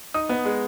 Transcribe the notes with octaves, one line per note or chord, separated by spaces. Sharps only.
D#4 D#6
B3
G#3